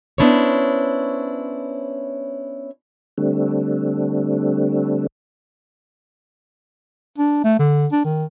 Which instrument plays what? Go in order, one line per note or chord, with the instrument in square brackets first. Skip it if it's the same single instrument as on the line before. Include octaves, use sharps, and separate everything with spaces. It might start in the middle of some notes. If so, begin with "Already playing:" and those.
[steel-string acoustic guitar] B3 C#4 D4 E4 C5 C#5
[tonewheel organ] D3 G3 A3 C4 D4
[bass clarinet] D4
A3
D3
D4
D#3